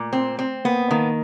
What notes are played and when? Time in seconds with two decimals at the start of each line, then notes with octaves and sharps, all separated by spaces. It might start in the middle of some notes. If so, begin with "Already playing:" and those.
Already playing: A#2 A3
0.13 C4
0.39 C4
0.65 A#3 B3
0.91 D#3 A#3